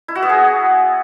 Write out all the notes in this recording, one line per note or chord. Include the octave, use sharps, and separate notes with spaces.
E4
F#4
B3
G#4